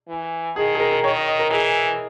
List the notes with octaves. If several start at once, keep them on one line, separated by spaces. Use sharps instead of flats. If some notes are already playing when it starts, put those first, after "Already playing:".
E3
D#3 G#4
G#4
A#4
A#4
D#3 C#5
D#5
D#5
A#4
E3 G#4